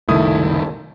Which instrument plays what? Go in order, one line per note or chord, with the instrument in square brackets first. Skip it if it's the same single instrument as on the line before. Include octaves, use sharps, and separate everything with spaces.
[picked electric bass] F#1 C2 D#3 [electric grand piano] A3 E4 D#6